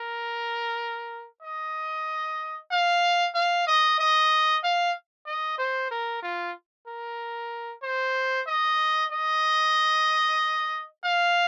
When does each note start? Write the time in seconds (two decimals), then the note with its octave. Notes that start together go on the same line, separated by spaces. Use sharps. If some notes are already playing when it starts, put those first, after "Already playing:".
Already playing: A#4
1.43 D#5
2.71 F5
3.35 F5
3.67 D#5
4.00 D#5
4.64 F5
5.27 D#5
5.59 C5
5.91 A#4
6.23 F4
6.88 A#4
7.83 C5
8.47 D#5
9.12 D#5
11.04 F5